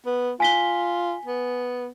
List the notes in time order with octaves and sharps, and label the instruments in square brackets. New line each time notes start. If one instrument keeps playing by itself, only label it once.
[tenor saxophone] B3
[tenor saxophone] F4 [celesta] G#5 B6 G7
[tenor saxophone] B3